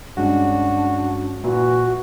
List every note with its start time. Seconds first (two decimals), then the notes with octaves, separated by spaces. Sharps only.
0.17 G2 G#3 C#4 D4 F#4
1.44 A#2 E3 F#4